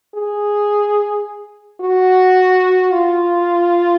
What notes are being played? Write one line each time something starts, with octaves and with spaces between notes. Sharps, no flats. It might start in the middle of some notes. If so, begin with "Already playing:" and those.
G#4
F#4
F4